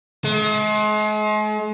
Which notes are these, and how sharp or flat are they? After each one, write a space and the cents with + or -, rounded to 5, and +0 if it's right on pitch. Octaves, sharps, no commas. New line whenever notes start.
G#3 +40